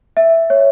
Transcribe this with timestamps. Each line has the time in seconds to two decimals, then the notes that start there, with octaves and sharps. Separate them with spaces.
0.17 E5
0.50 C#5